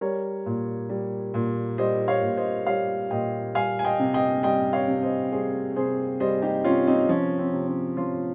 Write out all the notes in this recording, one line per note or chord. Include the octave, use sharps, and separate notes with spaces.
G3 A#4 C#5
A#2
G3
A#2
G3 C5 D#5
C#5 F5
A#2
C5 D#5
G3 C#5 F5
A#2 D#5 G5
G3 F5 G#5
G#5
D#5 G5
C3
D#5 G5
G3 D#5 G5
C#5 F5
C3
C5 D#5
G3 G#4 C5
C3 G#4 C5
G3 C5 D#5
D#4 G4
C3 C#4 F4
C4 D#4
F3 C#4
C4
C3
C#4
F3 C#4 F4